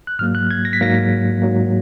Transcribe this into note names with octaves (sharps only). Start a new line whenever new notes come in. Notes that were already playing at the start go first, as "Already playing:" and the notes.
F#6
G#2 F#3 A#3 F6
F#6
G#6
A#6
B6
G#2 F#3 A#3 A#6
G#2 F#3 A#3